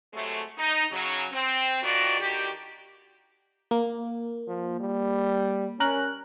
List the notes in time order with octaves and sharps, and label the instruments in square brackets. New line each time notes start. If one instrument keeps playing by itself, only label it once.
[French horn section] C3 F#3 G#3 A3
D#4
C#3 F#3
C4
F2 D#3 E3 F4 F#4 D5
D3 D#3 F#4 G4
[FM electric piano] A#3
[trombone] F3
G3
[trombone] C#4 [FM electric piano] A#4 F#6